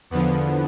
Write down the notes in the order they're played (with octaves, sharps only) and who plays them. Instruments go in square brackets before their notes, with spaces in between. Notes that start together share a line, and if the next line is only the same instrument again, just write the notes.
[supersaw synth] E2 D3 F3 B3